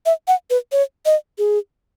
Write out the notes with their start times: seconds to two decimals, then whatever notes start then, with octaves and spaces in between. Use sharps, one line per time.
0.06 E5
0.28 F#5
0.50 B4
0.72 C#5
1.06 D#5
1.38 G#4